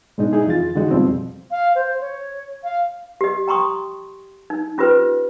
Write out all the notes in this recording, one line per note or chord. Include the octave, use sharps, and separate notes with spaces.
G#2 B2 G#3 D4 D#4
D#4 E4 G#4
F2 E3 F4 A6
D3 E3 G#3 D#4 F#4 G#4
F2 B2 F3 G3 C4
F5
C5
C#5
F5
G4 D#5
G5 A#5 C6 C#6 D#6
D#4
C#4 F4 G4 B4 C5